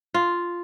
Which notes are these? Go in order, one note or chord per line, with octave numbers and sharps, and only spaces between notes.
F4